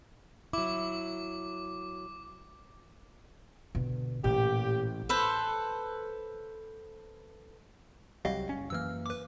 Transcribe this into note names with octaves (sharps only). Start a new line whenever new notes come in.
F#3 E4 D6
B2 D3
A1 A#2 G4
A4 B4 C5
C2 F#3 G3 D#5 F5
F#1 C#4
F#2 E3 A#3 E6 F6
B4 D6